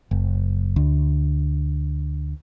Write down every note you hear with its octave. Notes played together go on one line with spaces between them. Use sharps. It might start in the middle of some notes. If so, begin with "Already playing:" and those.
F#1
D2